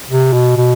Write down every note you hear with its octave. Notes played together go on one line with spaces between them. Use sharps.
C3
B2
B2